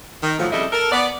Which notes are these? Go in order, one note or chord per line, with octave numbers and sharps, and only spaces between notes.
D#3
A2 F3 F#3
F2 C#3 G3 E4 A4 D#5
A4 A#4
B3 D5